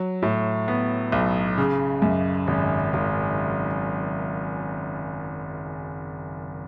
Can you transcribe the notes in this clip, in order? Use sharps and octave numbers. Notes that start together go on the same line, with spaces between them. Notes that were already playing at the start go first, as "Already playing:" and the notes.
Already playing: F#3
A2
B3
B1
C#3
F#2
G#1
G#1